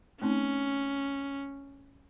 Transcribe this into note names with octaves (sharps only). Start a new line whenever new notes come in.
A3 C4 C#4 D#4